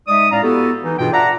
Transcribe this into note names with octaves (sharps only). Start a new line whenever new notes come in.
G#3 D#4 D5 E5 D#6
A2 G#3 C#4 D5 F5 A#5
B3 E4 F#4 G4 A4
E3 D#4
G2 B2 E3 F4 G#4 G5
F4 D5 E5 F#5 A5 A#5